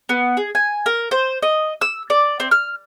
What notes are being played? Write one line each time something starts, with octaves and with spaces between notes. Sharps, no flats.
B3
G#4
G#5
A#4
C5
D#5
E6
D5
C4
F6